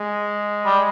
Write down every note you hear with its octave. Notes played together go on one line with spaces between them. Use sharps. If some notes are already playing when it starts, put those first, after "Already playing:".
Already playing: G#3
G3